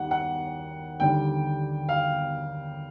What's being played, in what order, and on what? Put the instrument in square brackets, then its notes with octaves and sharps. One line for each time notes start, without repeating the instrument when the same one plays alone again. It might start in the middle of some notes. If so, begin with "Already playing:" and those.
Already playing: [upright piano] D#2 D#3 G3 F#5
F#5
D#2 D3 G3 G5
F5